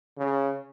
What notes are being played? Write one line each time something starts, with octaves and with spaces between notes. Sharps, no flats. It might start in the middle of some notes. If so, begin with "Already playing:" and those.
C#3